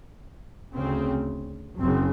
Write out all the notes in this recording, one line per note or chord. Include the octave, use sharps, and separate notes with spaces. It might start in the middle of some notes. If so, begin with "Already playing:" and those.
D2 C#3 C4
F#1 F#2 C#3 C4